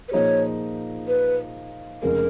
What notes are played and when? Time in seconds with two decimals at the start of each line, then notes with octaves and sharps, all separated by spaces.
0.08 B4
0.12 A#2 F3 A#3 D#4 G#4 C#5
1.08 B4
2.02 F1 F2 C#3 F3 G#3 A#4